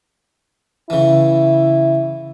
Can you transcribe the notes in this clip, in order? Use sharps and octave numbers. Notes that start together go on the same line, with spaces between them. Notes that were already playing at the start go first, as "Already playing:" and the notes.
C#3 E3 E4